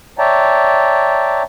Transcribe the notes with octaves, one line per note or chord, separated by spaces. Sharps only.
C#5 D5 E5 G5 A5 A#5